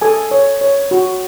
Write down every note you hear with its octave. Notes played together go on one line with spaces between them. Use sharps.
A4 G#5
C#5
C#5
F#4